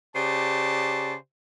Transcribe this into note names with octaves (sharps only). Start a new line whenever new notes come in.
C#3 G4 C5 D5 A5